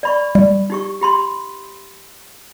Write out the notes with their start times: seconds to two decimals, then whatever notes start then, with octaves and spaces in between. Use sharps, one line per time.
0.03 D5 B5 C#6
0.35 G3
0.70 D#4 G4 C#6
1.01 G4 B5 C6